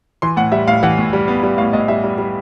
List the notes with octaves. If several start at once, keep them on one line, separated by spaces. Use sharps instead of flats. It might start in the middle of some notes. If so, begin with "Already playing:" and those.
E3 C6
A2 F#5
G3 E5
A2 F5
E3 F#5
A2
G3
B3
G3
A2 F5
A2 D#5
G3 E5
G3
G3